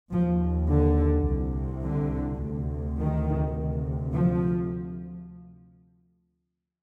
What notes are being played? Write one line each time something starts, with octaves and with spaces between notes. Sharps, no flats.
D#2 F3
D3
C2 C3
D3
D2 C3
D#3
D2 C3
F3